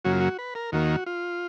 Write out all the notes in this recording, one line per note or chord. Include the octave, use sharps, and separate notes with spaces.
F#2 C#3 F#3 A#3 F#4
F4
F#4
B4
A#4
D#2 D#3 A#3 F#4
F4